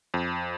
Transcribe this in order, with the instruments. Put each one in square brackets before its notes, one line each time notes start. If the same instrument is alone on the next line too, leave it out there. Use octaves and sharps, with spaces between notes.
[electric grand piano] F2